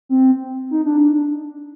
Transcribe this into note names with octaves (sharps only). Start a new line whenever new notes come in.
C4
D#4
D4